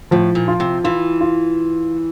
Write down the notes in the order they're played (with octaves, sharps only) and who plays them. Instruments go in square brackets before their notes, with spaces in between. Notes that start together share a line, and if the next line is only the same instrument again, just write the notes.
[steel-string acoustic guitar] A2 [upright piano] F3
[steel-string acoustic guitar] A#2
[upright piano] F4
[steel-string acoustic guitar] C3
[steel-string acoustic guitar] E3 [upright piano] F4
[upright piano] F4